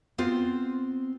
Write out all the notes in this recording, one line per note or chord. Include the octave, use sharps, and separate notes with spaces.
B3 C4 F4 C5